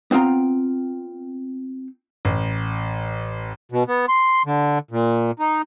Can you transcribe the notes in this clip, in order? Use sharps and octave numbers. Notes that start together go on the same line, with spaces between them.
B3 C4 F4 G5 A#5
A1
B2
B3
C6
D3
A#2
D#4